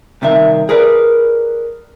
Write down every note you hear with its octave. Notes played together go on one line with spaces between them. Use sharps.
C2 C3 D#3 E5
G#4 A#4 B4 D5